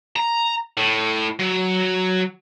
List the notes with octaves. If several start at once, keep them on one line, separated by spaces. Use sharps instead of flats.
A#5
A2
F#3